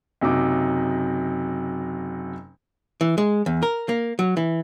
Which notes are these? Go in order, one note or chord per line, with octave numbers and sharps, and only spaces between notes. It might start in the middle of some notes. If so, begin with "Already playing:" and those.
F#1 C3 F#3 D#4 D6
E3
G#3
E2
A#4
A#3
F#3
E3